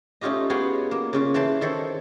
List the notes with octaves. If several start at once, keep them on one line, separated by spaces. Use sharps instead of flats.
A3 C#4 D#4 F4 G4 D#5
B3 F4 F#4 G#4 C#5 G5
A#3
C#3 C#4 F4
E3 G5 A5 C6
D#3 A4 C5 C#5